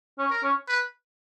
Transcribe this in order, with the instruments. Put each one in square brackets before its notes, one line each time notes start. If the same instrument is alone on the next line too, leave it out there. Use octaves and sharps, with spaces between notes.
[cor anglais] C#4
[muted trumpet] A#4
[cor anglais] C#4
[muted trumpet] B4